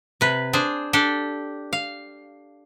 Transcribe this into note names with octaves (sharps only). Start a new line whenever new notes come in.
C3 B4
D4 G#4 C5
D4 G4 A4
F5